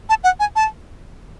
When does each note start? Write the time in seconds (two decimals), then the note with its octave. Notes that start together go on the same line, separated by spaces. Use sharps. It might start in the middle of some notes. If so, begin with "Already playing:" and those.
0.09 A5
0.24 F#5
0.40 G#5
0.56 A5